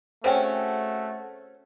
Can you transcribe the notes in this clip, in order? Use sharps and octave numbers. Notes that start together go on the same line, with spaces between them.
C#3 A3 C4 C#4 F#4 C5 C#5 G5